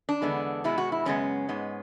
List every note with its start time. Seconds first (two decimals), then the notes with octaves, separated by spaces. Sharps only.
0.09 D4
0.22 E2 D3 G#3 B3
0.64 B2 G#3 B3 E4
0.78 F#4
0.92 E4
1.06 F#2 C#3 G#3 B3 C#4
1.49 G#2 G#3 B3